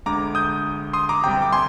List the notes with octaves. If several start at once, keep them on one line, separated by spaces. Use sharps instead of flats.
D2 D3 G#3 A#5 D6
D#6 G6
C6 D#6
A#5 D6
D2 C3 G3 G5 A#5
D6
G#5 C6